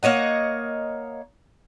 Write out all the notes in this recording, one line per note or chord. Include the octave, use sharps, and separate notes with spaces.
A#3 C#5 D#5 F#5